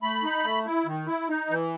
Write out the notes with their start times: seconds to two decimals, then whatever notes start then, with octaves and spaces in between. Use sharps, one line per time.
0.02 A3 B5
0.23 D#4
0.44 A3
0.66 E4
0.86 D#3
1.07 E4
1.29 D#4
1.50 E3